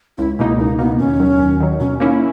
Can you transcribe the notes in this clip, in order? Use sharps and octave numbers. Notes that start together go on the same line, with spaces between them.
C#2 E4
B2 A#3 D#4 E4
C#2 D#4
B2 A#3 B3 D#4
D#2 C#4
D#3 F#3
D#2
D#3 F#3
B2 C#4
A#3 C#4 D#4 E4